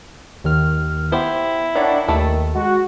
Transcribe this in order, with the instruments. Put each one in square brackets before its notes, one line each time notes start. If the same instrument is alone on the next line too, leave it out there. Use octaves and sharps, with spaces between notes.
[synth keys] D#2 D#3 F6
[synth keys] B3 [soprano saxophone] E4 [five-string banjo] G4 C5
[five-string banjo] D#3 [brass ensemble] D4 [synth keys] C#5 D5 F#5
[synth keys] D#2 [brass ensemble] D#3 [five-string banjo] A3 A4
[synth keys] G#3 [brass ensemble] F#4